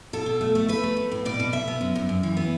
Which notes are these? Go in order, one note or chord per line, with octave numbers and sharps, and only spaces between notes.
B2 A4
B2
A3
A3
A3 B4
A3
A3
A2
B2 D5
B2
B2 E5
B3
F#2
F#2
F#2
E3
B3